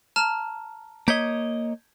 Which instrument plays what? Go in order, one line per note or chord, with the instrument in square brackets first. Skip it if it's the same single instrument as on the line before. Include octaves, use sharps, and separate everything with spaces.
[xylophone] A5 A#5 F6
[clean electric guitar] A#3 C#5 D#5 [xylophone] G6 G#6 B6